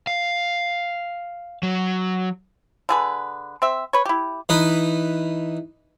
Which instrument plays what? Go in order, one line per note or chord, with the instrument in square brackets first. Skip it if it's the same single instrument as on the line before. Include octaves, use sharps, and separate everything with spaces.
[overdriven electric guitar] F5
F#3
[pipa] D3 G#4 B4
C4 E5
B4 C#5
E4 G4
[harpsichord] E3 D#4 B4